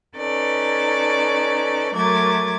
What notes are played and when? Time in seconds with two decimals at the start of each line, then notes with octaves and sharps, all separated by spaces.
0.18 C#4 D#4 A4 B4 D5
1.94 F#3 A3 A#4 D6 G#6 A6